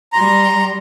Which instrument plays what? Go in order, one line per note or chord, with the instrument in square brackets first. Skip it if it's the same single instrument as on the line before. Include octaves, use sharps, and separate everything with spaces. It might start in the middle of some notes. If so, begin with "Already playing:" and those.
[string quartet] G3 C6 [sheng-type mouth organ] A#5